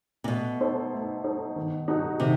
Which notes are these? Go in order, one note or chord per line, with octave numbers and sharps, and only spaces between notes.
C3
B2 A3
D#4 A4 C5
A3
D#4 A4 C5
D#3
G3 D#4 F#4 A4
C3 D#3